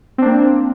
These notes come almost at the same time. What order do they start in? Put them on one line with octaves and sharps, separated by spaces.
C4 D4 A#3